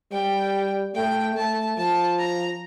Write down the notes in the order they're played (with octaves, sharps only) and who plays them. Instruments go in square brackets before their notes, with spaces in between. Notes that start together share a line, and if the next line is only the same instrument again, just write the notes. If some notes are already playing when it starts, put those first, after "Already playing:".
[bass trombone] G3 [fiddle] G5
[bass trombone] A3 [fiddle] G5
[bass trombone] A3 [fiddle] A5
[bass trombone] F3 [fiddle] A5
[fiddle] A#5